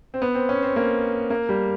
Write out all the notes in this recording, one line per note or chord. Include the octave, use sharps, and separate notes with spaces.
C4
B3
C4
C#4
C4
A#3
A#3
G3